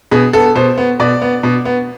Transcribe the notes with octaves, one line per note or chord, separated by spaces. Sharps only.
B2 G#4
B3 A4
B2 C5
B3
B2 D5
B3
B2
B3